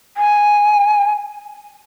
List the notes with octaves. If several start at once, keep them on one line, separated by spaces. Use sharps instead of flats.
G#5